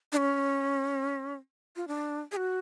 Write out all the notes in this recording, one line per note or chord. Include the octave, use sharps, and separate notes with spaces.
D4
C#4
F4
D4
G#4
F#4